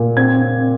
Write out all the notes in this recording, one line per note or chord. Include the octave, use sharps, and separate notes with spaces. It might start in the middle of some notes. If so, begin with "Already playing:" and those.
Already playing: A#2
C4 G#6
C4